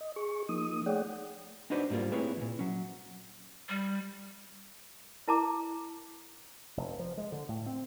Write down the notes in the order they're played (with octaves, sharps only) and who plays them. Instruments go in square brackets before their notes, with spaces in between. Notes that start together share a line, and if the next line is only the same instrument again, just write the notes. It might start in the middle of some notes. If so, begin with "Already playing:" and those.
[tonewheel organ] D#5
G#4 C#6
F3 A#3 D#4 D#6
A3 G#4 C#5 D5 F#5 G5
[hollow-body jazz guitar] D4 D#4 F#4 B4 C5 D5
G#2 G3 A#3 F4
A3 C4 E4 G#4 B4 C#5
D#2 A#2
F#3 C#4
[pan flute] G3
[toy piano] E4 A#4 A5 A#5 D6
[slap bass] F1
F3
G#3
D3
A2
C4